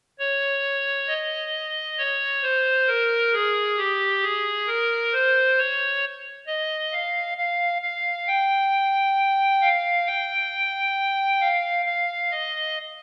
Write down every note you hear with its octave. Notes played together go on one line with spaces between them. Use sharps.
C#5
D#5
C#5
C5
A#4
G#4
G4
G#4
A#4
C5
C#5
D#5
F5
F5
F5
G5
F5
G5
F5
F5
D#5